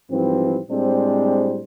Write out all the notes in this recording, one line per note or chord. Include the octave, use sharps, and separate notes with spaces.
G#2 E3 F3 G3 C4
A2 G3 G#3 C4 D4 C5